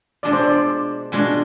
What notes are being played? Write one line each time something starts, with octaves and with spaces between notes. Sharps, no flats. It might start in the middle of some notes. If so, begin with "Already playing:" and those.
B2 G#3 D4 F4 D5
C5
D5
B2 G#3 D4 F4